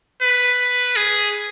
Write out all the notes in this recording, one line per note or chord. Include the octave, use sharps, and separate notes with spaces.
B4
G#4